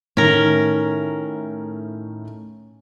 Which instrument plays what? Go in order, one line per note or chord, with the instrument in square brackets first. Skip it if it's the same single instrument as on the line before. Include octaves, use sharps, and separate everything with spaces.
[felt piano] A2 D#3 [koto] C#4 A#4